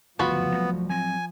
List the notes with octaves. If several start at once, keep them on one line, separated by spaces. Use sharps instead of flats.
F#1 D2 G2 F3 B3 F4 F#4 B5
C2 F#3 A3
F#3 C4 G#5